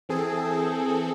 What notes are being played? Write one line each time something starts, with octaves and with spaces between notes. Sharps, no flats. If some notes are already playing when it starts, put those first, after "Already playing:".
E3 C4 G#4 A4